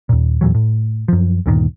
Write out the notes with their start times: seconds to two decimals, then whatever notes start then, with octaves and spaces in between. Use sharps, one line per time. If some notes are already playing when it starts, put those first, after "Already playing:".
0.09 D#2 A#2
0.41 E2 A#2 E3 F#3
0.55 A2
1.08 F#2 F3
1.46 D2 G2 A#2 D#3